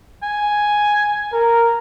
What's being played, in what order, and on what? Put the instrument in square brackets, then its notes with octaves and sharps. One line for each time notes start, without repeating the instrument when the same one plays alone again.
[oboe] G#5
[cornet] A#4